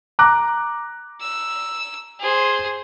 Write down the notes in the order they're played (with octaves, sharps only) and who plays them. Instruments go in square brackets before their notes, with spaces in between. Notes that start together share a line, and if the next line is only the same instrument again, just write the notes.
[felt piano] A#5 D6 F#6
[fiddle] E6
G#4 C5